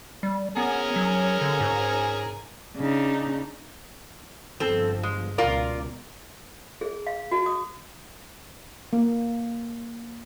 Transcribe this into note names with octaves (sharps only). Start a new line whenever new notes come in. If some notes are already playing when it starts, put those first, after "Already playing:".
G3
B3 C#4 G#4 A#4
F#3
D3
G#2
C#3 D4 D#4
G1 F3 C4 A4
G#3
C#2 B2 F4 A#4 D5
G#4
F5
F#4
D#6
A#3